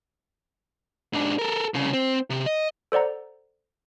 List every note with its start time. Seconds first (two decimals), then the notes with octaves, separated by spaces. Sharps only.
1.13 G#2 D4
1.39 A4 A#4
1.74 C2 C#3
1.93 C4
2.30 C3
2.46 D#5
2.92 A4 C5 D5 F#5 A#5